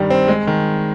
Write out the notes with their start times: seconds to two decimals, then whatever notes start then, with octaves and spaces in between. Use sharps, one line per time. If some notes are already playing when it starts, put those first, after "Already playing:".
Already playing: G2 D#3 G3
0.10 C4
0.28 G#3
0.47 D#3